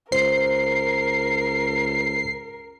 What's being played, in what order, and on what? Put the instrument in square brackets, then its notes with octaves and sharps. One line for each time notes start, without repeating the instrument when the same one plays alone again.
[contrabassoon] C#2 [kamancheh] A#4 [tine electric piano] C5 [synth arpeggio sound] C7